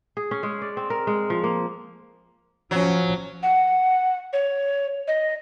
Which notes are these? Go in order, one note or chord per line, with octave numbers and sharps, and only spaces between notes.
G#4
C#4
G#3
D5
C4
A#4
G#3
F3
A#3
F3 F#3 C#4
F#5
C#5
D#5